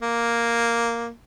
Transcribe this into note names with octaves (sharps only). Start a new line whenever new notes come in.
A#3